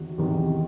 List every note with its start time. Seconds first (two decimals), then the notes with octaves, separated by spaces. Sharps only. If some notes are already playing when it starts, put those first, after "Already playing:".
Already playing: E2 C3 D#3 F#4
0.18 E2 C3 D#3